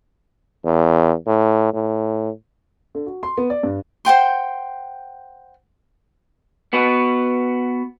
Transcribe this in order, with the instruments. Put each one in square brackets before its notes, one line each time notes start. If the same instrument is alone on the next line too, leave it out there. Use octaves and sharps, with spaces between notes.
[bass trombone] E2
A2
A2
[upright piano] D3
F#4
C6
B3
D5
G2
[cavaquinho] C5 F#5 G5 C6
[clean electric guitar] B3 F#4 B4